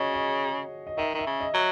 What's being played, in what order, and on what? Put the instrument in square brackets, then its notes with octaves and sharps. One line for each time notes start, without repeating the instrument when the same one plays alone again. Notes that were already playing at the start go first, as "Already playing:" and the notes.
Already playing: [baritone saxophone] C#3 [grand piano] F#4 G#4 C#5 D#5
[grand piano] D#5
D#5
[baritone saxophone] D#3 [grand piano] E5
[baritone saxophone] D#3 [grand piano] E5
[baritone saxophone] C#3
[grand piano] D#5
[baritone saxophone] F#3